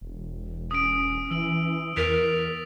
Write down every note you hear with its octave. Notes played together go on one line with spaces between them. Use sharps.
E1
C#4 D#6 D7
E3 E6 D7 F#7
E2 A#4 A6 B6 F7